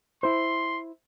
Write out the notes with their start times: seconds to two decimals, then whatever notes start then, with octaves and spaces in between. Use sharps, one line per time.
0.23 E4 C5 C6